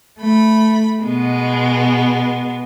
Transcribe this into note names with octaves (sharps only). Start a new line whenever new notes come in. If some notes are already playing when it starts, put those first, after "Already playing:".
A3 B5
B2 G#3 B3